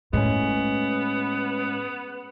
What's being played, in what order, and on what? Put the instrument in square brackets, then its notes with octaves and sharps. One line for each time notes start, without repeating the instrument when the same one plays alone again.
[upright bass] A2 [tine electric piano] G#3 C#4 [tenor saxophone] B3